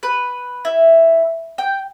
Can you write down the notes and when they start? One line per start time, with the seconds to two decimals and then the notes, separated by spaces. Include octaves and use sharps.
0.03 B4
0.65 E4
1.58 G5